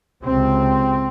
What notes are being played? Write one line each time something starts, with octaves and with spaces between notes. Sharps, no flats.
C#2 C3 C4